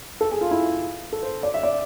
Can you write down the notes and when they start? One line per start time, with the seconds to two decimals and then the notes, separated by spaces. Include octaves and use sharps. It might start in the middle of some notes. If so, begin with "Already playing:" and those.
0.21 A4
0.31 G#4
0.41 F4
0.51 E4
1.13 A4
1.23 C5
1.43 D5
1.54 E5
1.63 D5